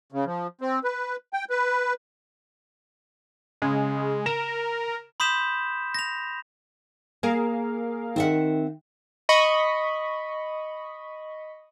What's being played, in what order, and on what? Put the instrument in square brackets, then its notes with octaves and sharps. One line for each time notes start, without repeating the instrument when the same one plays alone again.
[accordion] C#3
F3
C4
B4
G5
B4
[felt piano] C#3 [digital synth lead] G#3
[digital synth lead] A#4 [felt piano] E7
[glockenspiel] B5 C6 D#6 G6 B6 E7
A#6 F7
[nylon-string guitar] A#3 [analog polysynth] G#4 A#4 F5
[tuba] D#3 [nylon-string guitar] C4 E5 F#5
[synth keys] D#5 B5 C#6